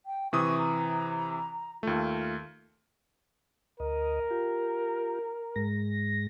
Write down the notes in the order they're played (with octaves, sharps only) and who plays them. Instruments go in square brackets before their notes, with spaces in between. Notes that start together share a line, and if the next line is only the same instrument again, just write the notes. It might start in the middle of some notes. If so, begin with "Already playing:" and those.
[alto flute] G5
[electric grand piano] C3 E3 D#6 [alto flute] C#6
[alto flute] A#5
[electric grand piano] D#2 A3 [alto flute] F4
[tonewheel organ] D2 D#5 [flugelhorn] A#4
[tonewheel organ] F4 G4
G#2 G#3 A#6